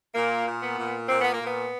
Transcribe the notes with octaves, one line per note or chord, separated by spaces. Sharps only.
A#2 A#3
A#2
B3
A#2
A#2 C4
B3
A#3
A#2
B3